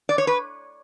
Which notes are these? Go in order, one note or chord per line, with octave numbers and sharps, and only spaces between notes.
D5
C#5
B4